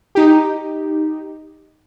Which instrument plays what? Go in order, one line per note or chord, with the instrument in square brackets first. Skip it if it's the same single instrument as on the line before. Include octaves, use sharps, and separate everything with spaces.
[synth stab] D#4 G4